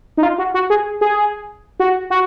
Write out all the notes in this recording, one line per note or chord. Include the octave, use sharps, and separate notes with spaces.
D#4
F4
F#4
F#4
G#4
G#4
F#4
F#4